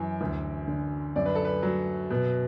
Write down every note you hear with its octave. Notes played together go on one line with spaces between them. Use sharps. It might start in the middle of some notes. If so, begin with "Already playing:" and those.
Already playing: F#2 E3
D2
D3
F#2 D5
B4
A4
B4
F#3
B2